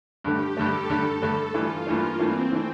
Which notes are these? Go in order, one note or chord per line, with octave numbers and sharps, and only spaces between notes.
G2 D3 A3 G4
G2 D3 A3 A4
G2 D3 A3 A4
G2 D3 A3
G2 E3 A3 F4
G2 E3 A3 A#3
G2 E3 A3 C4
E3 A3